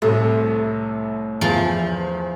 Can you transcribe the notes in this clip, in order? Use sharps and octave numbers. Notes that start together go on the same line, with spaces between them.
C2 A2 C3 A3
E2 E3 F3